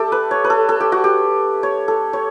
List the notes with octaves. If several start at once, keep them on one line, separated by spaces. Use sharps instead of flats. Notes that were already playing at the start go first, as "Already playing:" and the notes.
Already playing: A3 D4 G4 A4
B4
C#5
B4
A4
A4
G4
F#4
G4
C#5
A4
C#5